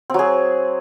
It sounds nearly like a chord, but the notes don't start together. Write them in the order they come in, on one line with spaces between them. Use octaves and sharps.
C4 F#3 G#4